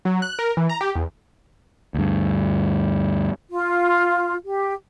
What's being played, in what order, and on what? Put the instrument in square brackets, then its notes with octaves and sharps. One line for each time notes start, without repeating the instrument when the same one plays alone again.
[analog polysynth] F#3
F#6
A#4
E3
A#5
G4
E2
[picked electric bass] D2 G2
[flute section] F4
G4